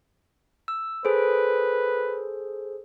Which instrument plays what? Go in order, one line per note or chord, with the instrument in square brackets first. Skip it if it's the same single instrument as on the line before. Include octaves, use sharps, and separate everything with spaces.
[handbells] E6
[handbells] G#4 A4 C5 [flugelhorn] B4